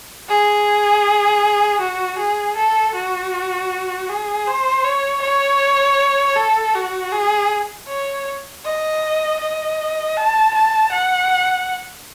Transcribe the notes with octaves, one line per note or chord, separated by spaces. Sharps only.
G#4
F#4
G#4
A4
F#4
G#4
C5
C#5
C#5
A4
F#4
G#4
C#5
D#5
D#5
A5
A5
F#5